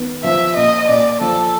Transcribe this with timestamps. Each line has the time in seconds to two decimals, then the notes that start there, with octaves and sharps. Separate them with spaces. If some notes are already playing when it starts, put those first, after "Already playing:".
Already playing: D#3 B3
0.24 F3 E5
0.56 A#2 D#5
0.89 A#2 D5
1.21 F3 A4